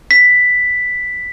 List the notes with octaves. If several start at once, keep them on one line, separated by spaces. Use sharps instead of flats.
B6